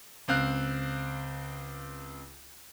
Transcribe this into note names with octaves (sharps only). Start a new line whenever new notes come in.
C#2 C4 F5 F#6